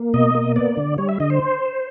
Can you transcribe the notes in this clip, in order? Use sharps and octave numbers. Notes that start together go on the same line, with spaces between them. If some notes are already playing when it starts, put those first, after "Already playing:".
Already playing: A#3
B2 D#5
A#3
B3 D5
D3
G3 C#5
E5
D3 D#5
C5